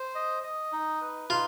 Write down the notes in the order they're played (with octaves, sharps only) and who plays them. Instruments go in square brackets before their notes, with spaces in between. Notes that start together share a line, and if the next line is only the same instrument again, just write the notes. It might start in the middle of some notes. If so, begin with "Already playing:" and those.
Already playing: [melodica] C5
D#5
D#5
D#4
B4
[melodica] D#4 [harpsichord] F4